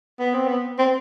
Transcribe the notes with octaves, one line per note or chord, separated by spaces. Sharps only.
B3
C4
B3
C4